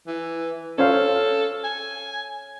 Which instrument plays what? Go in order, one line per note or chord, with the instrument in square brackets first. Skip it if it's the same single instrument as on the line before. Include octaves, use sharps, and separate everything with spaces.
[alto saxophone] E3
[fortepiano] C#4 C5 F5 [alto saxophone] A4
[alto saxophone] G#5